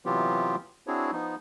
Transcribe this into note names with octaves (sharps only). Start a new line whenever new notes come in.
C3 E3 F#3 B3 F4 G4
C4 D4 E4 F#4 G#4 C#5
F3 B3 D#4